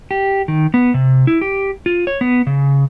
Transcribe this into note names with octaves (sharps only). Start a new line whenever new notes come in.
G4
D#3
B3
C3
E4
G4
F4
C#5
B3
C#3